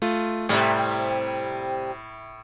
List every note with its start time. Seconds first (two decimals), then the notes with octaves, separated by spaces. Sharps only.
0.02 A3 F4
0.49 A2 C3 G3 E4